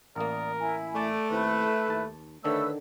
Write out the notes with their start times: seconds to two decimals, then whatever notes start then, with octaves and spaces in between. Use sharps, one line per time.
0.16 A1 A#3 A#4 D5 D#6
0.59 E4 G#5
0.95 A3 D5
1.30 D#2 C4 E4 B4
1.88 D#2 A5
2.44 D3 D#3 A3 D4 B4 C#5 E6